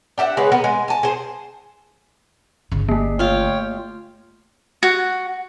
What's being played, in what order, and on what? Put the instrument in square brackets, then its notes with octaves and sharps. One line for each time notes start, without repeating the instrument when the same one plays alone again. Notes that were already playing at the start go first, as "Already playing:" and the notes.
[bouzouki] D4 G4 E5 F#5
C#3 G#3 G#4 B4
B3 A#4
G#3
G#5 A5
G#4 C5
[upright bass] G1 C#3
[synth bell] A3 A#3
[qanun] F4 F5 [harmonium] C#5 G5
[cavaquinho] F#4